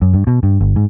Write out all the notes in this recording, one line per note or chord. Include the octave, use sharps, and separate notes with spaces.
F#2
G2
B2
G2
G1
G#2